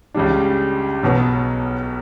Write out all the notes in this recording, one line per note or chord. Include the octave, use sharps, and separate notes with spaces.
C#2 C#3 G3 D4
B1 B2 F#3 B3